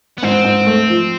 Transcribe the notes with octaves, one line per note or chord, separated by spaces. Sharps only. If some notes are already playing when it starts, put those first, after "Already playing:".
B3
G#2 C4
G#2
A3
F3